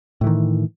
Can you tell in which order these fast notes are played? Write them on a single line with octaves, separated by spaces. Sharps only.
A2 E3 D#3